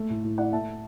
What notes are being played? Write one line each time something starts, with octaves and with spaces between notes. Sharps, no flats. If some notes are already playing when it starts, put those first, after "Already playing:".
Already playing: A3
A2
A2
E4 D5 F#5
A3 E5 A5